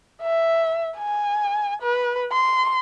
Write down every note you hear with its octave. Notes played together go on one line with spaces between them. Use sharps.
E5
G#5
B4
C6